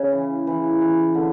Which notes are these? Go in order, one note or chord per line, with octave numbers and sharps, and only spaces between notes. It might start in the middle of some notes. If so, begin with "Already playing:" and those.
Already playing: C#3
E3
E3
E3
D3